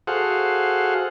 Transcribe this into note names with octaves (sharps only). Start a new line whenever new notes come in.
F#4 G#4 A4 C5 F5 F#5